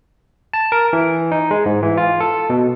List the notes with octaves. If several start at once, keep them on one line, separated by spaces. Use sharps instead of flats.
A5
A#4
E3
D#4
G#3
G#2
E3
F4
A4
B2